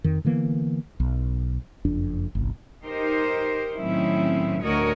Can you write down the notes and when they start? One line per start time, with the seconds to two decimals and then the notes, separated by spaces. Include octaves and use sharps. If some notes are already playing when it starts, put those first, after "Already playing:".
0.04 F2 D#3
0.25 D3 E3 A#3 B3
1.00 B1
1.85 F#1 F2 D4
2.35 G1 C2
2.83 D#4 G4 A#4 C5
3.75 A2 D#3 F#3 C4 C#4 E4
4.62 D2 A2 F#4 A#4 C#5 D#5